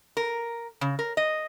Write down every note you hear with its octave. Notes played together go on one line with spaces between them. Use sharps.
A#4
C#3
A#4
D#5